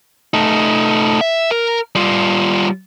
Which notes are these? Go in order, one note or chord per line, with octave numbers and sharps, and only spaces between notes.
A3 D#4
E5
A#4
G3 F4